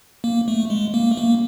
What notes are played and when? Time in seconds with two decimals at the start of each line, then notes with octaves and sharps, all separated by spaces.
0.24 A#3
0.48 A3
0.70 G#3
0.94 A#3
1.11 A3
1.17 A#3